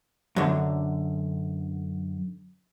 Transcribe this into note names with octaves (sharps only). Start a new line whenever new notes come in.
F#2 D3